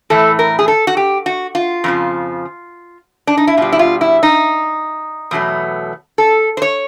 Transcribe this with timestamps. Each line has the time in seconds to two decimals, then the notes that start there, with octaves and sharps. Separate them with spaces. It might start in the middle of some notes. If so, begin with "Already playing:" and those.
0.10 A2 E3 A3 A4
0.39 A#4
0.59 G#4
0.68 A4
0.87 F#4
0.97 G4
1.26 F#4
1.55 F4
1.84 F2 C#3 F3
3.27 D4
3.37 D#4
3.47 E4
3.57 B2 G3 F4
3.72 E4
3.79 F4
4.01 E4
4.23 D#4
5.31 E2 B2 F#3 A3
6.18 A4
6.57 C5
6.62 C#5